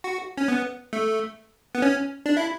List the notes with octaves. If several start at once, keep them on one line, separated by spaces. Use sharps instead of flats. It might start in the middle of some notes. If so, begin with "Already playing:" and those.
F#4
C#4
B3
A3
B3
C#4
D4
E4